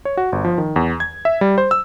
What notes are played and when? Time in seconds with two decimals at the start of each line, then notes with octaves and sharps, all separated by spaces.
0.05 C#5
0.17 F#4
0.32 G1
0.45 F3
0.58 D#3
0.76 E2
1.00 G#6
1.25 E5
1.41 G3
1.58 C5
1.71 E6